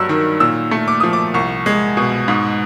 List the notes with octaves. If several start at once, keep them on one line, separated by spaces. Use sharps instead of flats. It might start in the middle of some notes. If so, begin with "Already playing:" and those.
Already playing: G2 F#3 E6
D#3
A#2 E6
A3
D6
F3 D#6
D6
C2 C#6
G#3
B2
G#2